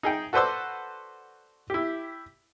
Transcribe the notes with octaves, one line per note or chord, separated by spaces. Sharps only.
D#4 G#4 G5
F#4 A4 B4 C5 D5 E6
E4 G4